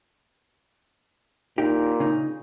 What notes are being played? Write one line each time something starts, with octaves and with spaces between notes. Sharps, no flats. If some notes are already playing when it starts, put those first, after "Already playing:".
A#2 D#4 G4
C#3 D#4